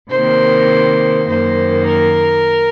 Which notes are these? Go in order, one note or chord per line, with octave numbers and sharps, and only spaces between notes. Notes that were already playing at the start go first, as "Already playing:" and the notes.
C3 D#3 A#3 C5
F#2 D#3 A#3 C5
A#4